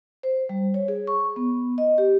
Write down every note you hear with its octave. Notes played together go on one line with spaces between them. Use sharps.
C5
G3
C#5
G#4
C#6
B3
D#5
G4